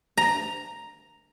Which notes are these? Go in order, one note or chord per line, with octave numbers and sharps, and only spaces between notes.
A#5